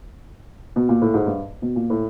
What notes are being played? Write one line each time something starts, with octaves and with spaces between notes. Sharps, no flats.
B2
A#2
A2
G#2
G2
B2
A#2
A2